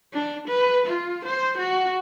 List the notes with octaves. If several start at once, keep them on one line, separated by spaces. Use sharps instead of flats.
D4
B4
F4
C5
F#4